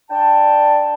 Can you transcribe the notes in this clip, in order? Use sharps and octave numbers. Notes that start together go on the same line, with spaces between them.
D4 G5 A5